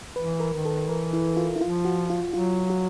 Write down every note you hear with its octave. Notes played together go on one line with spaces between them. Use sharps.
E3 B4
A#4
D#3
A4
E3 A#4
E4
F4
E4
F3 F4
F#4
F4
F#3 F4
F#4